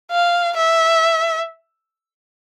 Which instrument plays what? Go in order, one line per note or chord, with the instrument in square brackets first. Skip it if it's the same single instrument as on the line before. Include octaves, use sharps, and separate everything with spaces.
[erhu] F5
E5